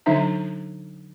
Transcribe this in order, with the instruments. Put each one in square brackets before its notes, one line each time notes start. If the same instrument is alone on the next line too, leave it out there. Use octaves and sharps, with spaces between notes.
[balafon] D3 F#3 D4 D#4 E5 A#5